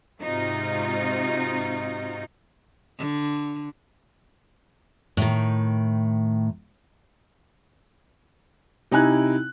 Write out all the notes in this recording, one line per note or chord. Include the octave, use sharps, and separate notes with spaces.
G#2 C3 C4 D#4 F4 F#4
D3
A2 D#3
C3 D#4 E4 G#5 F#6